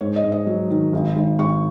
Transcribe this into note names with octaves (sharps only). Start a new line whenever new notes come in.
G#2 C#5
D#5
G#2
D#5
F#3
D#3
G#1
G#1
G#1 C#6